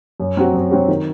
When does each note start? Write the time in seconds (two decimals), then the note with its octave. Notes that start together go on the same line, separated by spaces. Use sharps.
0.20 F#2
0.37 F#3 C4 F#4
0.53 F#2
0.71 F#3 C4 F#4
0.88 D#3